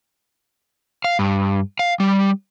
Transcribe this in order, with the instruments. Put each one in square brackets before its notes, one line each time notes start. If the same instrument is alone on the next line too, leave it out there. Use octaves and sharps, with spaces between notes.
[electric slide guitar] F5
G2
F5
G3